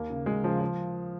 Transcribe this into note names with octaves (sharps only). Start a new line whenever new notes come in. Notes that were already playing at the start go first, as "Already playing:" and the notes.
Already playing: D#2 A#3
C#3
D#2 G#3
C#3 F3
F3